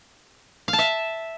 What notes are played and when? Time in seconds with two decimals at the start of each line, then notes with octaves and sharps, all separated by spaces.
0.68 F5
0.73 A5
0.79 E5